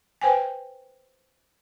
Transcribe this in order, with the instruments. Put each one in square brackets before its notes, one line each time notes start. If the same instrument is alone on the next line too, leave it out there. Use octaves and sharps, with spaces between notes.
[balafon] B4 C5 G5 G#5